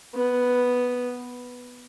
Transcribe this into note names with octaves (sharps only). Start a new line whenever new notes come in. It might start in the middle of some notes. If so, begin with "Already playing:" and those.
B3